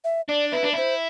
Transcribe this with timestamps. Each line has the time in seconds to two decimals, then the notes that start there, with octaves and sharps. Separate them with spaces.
0.04 E5
0.29 D4 D5
0.52 E4 B4
0.63 D4
0.73 E4 C5